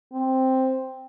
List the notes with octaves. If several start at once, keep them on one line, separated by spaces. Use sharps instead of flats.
C4